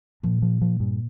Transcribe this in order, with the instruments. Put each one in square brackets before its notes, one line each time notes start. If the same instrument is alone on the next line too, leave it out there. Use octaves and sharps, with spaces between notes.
[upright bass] A#2 [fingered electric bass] F3
[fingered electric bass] F3
F3
G2